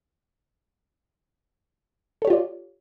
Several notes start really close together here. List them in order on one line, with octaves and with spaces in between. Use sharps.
A4 C#5 G4 F4 D5